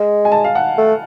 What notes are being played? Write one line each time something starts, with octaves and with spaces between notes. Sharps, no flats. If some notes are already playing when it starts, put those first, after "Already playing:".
Already playing: G#3
G#5
A5
F5
F#5
A3